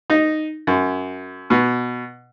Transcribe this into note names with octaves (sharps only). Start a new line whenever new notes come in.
D#4
F#2
B2